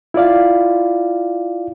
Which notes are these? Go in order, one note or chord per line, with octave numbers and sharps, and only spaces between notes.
E4 F4 D5 F5